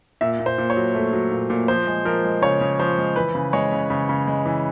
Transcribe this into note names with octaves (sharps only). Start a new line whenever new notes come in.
A#2 E5
A#2
C5
A#2
C#5
F#3
A3
F#3
A#2
A#2
F3 C5
G#3
F3 A#4
G#3
C#3 C#5
C#3
F3 C5
G#3
E3 B4
C#3
G#3 C#5
C#3
C#3
C#3
G#3
E3